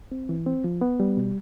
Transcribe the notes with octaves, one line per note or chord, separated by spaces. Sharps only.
C4
E3
C4
F3
B3
G3
B2